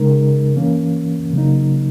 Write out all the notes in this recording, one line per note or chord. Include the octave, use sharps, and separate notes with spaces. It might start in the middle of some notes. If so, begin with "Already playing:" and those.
Already playing: C#3 G#3 D#4 A#4
E3 A#3 C#4
C#3 F#3 A#3 D#4